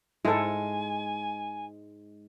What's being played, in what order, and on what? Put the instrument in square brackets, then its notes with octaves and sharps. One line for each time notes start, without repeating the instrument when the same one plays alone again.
[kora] G#2 G#3 [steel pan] E4 A4 [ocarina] G#5